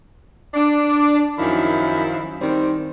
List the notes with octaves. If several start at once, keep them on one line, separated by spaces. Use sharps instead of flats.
D4
F#2 D#3 F3 E4
D#3 G3 C4